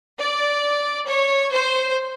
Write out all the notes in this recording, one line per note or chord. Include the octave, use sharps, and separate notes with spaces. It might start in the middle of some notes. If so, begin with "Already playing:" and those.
D5
C#5
C5